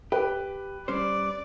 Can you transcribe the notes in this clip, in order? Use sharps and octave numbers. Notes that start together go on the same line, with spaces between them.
G4 B4
G3 C#4 C5 D5